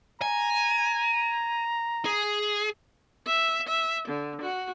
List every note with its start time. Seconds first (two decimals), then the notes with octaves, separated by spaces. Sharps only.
0.22 G#5 A#5
2.05 G#4
3.26 E5
3.68 E5
4.08 D3
4.41 F#4